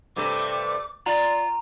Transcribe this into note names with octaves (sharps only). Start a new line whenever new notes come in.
G2 C3 A3 D6
F4 D5 A#5